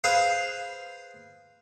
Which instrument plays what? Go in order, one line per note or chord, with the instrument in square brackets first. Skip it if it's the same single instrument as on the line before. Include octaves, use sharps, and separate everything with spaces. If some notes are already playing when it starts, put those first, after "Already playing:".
[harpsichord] G#4 B4 C5 F5